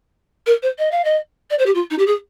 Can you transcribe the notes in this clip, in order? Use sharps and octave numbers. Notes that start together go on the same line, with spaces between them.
A#4
C5
D#5
F5
D#5
D5
C5
G4
F4
D#4
G4
G#4